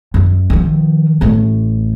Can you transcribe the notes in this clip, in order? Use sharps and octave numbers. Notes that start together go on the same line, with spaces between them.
F#2
D#3 F3
A1 A3